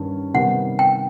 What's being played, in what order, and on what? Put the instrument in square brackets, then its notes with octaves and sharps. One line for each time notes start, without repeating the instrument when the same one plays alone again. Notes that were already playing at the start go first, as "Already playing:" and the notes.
Already playing: [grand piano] G2 D#3 C#4
[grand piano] C3 D#3 G3 B3 [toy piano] F#5
[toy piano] G5